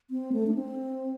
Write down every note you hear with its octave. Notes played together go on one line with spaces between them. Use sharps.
C4
A3
D4
C4